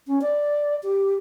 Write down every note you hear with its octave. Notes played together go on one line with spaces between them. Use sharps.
C#4
D5
G4